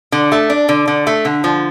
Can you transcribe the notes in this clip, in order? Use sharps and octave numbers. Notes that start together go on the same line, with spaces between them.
D3
A3
D4
D3
D3
A3
D3
F3